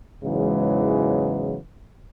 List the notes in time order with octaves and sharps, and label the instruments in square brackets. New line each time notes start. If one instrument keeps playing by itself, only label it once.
[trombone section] E2 G#2 C#3 E3 F#3 G#3